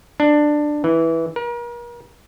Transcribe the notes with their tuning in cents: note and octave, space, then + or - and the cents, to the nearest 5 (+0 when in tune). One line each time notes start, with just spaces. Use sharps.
D4 +15
E3 -10
A#4 +40